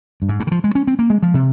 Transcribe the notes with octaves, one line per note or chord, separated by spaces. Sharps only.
G2
G#2
G2
D#3
F3
G#3
C#4
C4
A#3
G#3
F3
C3